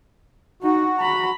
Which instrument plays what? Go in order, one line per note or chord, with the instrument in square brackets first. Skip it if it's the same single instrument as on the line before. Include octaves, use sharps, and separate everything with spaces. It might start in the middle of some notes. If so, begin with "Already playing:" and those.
[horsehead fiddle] D#4 [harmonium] F#4
[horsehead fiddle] A#5 B5